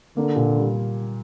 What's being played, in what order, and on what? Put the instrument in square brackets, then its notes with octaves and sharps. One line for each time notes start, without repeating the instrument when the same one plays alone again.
[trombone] D3 [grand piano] A#3
[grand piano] A#2
G3